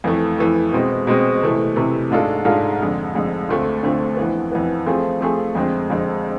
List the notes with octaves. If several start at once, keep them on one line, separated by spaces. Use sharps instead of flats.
F2 E3 A3
F2 E3 A3
B2 G#3 C4
B2 G#3 C4
C3 E3 A3
C3 E3 A3
G#2 G#3 D4 F4 A4
G#2 G#3 D4 F4 A4
F2 D3 G#3
F2 D3 G#3
D2 D3 A3 C4 F4
D2 D3 A3 C4 F4
F2 E3 B3
F2 E3 B3
F3 A3 C4 G#4
F3 A3 C4 G#4
F2 D3 G#3 C4
F2 D3 G#3 C4